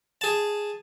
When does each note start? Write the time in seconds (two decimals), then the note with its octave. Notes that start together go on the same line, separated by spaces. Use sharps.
0.21 G#4 A5